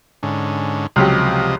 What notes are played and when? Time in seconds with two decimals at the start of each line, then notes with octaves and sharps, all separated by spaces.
0.23 G#2 D3 C#4
0.96 C#2 C3 F3 F#3 G4 D#5